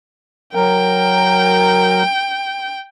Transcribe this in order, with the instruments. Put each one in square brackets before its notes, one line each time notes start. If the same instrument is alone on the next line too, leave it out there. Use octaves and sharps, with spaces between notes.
[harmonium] F#3 A#4 [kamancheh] G5